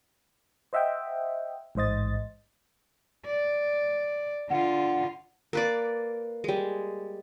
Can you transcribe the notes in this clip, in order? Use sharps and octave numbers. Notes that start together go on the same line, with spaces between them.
C5 D#5 E5 F#5 G5
A1 G#2 C5 D#5 A6
D5
D3 F4 F#5
A#3 B4 D5
G3 G#3